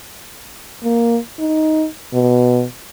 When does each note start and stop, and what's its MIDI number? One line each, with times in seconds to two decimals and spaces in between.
0.84 1.18 58
1.39 1.86 63
2.13 2.64 47